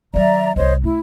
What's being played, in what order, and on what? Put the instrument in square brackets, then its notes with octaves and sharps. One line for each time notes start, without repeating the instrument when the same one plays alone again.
[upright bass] D#3 F#3 [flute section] D5 E5 A#5
[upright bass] C2 E4 [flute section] C5 C#5 D#5
[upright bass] A3 [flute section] E4